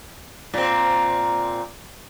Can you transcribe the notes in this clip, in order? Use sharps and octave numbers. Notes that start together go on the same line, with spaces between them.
A#2 C4